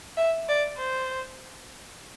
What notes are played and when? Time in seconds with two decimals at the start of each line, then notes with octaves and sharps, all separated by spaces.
0.17 E5
0.49 D5
0.78 C5